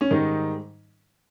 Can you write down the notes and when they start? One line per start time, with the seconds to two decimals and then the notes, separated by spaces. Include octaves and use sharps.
0.01 C#4
0.11 G#2 D#3 G3 D#4